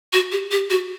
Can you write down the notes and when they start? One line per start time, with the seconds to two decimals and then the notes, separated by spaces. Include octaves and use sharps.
0.13 F#4
0.32 G4
0.51 G4
0.70 F#4